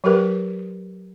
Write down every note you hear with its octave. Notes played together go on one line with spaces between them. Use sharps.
F#3 G4 A#4 B4